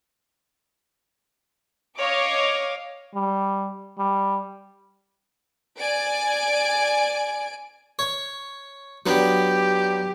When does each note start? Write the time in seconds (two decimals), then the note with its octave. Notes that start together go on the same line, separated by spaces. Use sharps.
1.99 C#5 D#5 F5 D6
3.15 G3
3.98 G3
5.80 D5 G#5 D7
7.99 C#5
9.06 F#3 B3 D4 G4